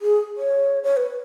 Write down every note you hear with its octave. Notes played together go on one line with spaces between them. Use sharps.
G#4
C#5
C#5
B4